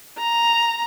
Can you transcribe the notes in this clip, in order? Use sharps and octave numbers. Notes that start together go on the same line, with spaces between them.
A#5